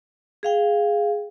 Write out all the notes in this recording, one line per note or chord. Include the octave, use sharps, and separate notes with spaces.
G#4 F5 G5